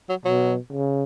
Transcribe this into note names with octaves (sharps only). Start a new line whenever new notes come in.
F#3
B2 F#3
C#3